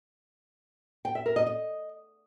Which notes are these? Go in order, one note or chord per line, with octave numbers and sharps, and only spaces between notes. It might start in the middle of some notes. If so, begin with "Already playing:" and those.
G5
E5
A#4
D#5
D#5